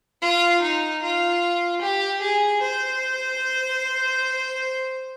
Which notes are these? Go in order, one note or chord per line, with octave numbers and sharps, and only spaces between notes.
F4
D#4
F4
G4
G#4
C5